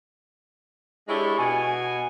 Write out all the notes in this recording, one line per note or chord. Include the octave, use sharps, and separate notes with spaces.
G#3 D4 E4 G4 A4 C#5
B2 G#5